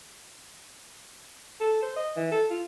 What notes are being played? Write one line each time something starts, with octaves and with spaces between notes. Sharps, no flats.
A4
C5
D#5
E3
A4
F4